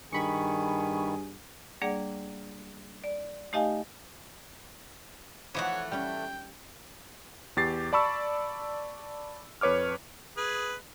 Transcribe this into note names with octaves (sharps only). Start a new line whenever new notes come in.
G2 D#3 G#4 B5 C#6
G3 A#3 D4 G#4 D5 F#5
D5
A3 D#4 G4 D#5 F5 G#5
E3 F3 A3 D#4 F#4 C#5 F#5
G3 C#4 G5
E2 G4 A6 C7
D5 A5 B5 C#6 E6
F2 B4 C#5 D6 F6
G#4 B4